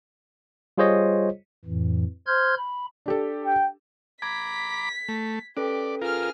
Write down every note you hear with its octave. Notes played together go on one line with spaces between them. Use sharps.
G3 F4 G#4 C5 C#5 D#5
F2 A2 E3
C5 C6 F6 G6 G#6
B5
D4 G4 A4
G5
A#5 B5 D6 G#6 B6
A3
C#4 G4 A4 B4 D5
F4 G#4 A#4 F6